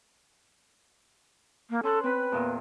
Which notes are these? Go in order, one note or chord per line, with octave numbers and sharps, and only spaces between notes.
A#3
C#4 A4 C6 F#6
C4 B4 B5 F#6
E2 A#2 A#3